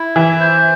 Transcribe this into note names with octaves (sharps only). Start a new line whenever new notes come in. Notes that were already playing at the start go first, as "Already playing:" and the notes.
Already playing: E4
E3 E5
C5